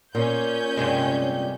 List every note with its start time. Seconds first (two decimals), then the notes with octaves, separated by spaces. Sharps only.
0.15 A#2 C#4 G6
0.77 G2 C3 G#3